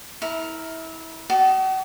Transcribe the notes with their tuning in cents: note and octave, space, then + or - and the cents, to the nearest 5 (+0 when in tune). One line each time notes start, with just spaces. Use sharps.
E4 -25 A#4 +0
F#4 +40 A5 +0 D#6 +0